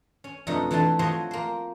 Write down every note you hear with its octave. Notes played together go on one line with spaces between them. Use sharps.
C#4
F2 B2 A3 D4 D#4
E3 A3 D4 E4 A5 C6
F3 C4 F#4 C5 C#5 D#5
A#3 C5